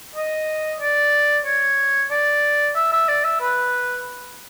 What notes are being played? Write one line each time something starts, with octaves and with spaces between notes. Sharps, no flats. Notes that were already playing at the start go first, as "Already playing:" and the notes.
D#5
D5
C#5
D5
E5
E5
D5
E5
B4